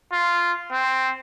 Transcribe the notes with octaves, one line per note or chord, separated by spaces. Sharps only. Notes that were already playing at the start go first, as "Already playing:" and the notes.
F4
C4